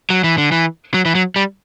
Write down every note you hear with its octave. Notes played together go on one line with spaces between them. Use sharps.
F#3
E3
D3
E3
F#3
E3
F#3
G3